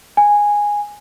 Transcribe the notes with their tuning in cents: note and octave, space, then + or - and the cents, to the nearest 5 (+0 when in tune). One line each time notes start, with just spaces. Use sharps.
G#5 -10